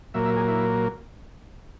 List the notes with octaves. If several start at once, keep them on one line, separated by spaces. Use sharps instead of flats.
A#2 F#3 A#3 E5
E5
G#4
E4